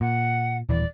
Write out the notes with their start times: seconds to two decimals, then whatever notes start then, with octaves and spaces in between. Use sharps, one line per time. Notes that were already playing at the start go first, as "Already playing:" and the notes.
0.01 A#2 F#5
0.69 D#1 E3 D5